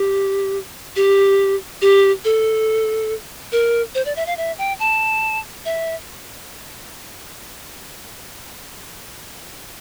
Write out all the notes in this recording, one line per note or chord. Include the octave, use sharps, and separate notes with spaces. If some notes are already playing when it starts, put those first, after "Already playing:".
Already playing: G4
G4
G4
A4
A#4
C5
D5
E5
F5
E5
G5
A5
E5